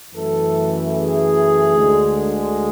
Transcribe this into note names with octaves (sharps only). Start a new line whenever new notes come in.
F#2 E3 A3 A4
G#4
D2 D3 G#3